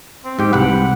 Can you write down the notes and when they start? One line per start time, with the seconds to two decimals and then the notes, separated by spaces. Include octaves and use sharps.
0.24 C4
0.39 G#2 G4 G5
0.53 C2 B4 F#5